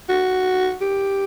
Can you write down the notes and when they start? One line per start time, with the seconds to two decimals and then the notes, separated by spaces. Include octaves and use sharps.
0.09 F#4
0.82 G4